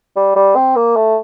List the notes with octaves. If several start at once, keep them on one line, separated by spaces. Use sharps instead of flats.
G3
G3
C4
A#3
A3